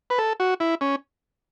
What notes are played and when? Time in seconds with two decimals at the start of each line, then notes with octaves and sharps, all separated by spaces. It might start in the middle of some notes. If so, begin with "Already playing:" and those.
0.10 B4
0.18 A4
0.40 F#4
0.60 E4
0.81 C#4